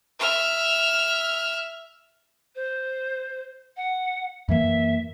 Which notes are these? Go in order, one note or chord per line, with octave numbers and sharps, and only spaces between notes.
E5 F6
C5
F#5
F#2 E3 A#3 E5